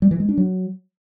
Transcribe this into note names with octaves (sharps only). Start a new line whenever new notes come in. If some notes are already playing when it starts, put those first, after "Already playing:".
G3
E3
G#3
D4
F#3